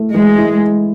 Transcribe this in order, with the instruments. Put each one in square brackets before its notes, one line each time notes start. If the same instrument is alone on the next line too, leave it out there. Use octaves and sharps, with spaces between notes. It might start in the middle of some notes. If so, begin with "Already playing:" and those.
Already playing: [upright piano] A3 E4
[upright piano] E3 [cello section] G#3
[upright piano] E4